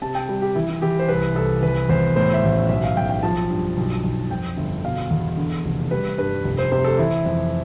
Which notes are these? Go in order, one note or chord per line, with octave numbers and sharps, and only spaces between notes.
C3 A5
G5
G3
G4
E3 E4
E4
E3 G4
C5
C2 B4
C2 A4
E3 B4
E2 C5
A2 C5
E5
A1
B1 E5
F5
B1 G5
G5
F3 A5
G2
B1
B1
F2 G5
G1
B2 F5
E2
D3
F1
G3 B4
G2 B4
F1
C5
C3 C5
A4
E3 E4
F2